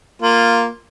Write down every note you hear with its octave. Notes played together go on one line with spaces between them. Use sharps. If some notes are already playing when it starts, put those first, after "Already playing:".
A#3 F4